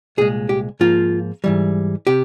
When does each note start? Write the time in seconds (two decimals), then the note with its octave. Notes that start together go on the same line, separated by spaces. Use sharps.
0.17 C2 A#2 G#3 G#4
0.49 G4
0.80 G#2 F3 A#3 F4
1.44 G#2 E3 G3
2.07 C3 G4